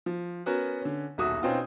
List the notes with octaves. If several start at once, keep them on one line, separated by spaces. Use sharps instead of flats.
F3
B3 C#4 F#4 A#4
D3 C#4
D#1 B1 F#4 E5 D#6
B2 C4 C#4 D#4 F4